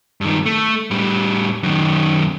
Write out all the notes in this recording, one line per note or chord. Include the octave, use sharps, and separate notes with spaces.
G2 D#3
A3
A2 G3
F#2 D#3